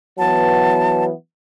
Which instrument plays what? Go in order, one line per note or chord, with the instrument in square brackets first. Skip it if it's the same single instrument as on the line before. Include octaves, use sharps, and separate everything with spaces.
[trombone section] E3 F#3 B3 [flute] A5